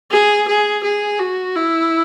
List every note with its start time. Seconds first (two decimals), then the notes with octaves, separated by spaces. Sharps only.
0.11 G#4
0.48 G#4
0.83 G#4
1.19 F#4
1.56 E4